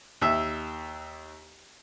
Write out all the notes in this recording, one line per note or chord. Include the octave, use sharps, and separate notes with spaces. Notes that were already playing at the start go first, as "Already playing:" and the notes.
D#2 E5